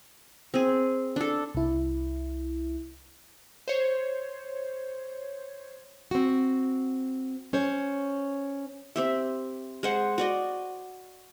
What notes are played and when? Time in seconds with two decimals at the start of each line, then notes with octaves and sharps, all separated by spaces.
0.54 C4 G#4
1.16 D4 A4
1.54 C2 E4
3.68 C5 C#5
6.11 C4 F#4
7.53 C#4 C5 C#5
8.96 C4 G4 E5
9.83 G#3 C5 F#5
10.18 F#4 D5 D#5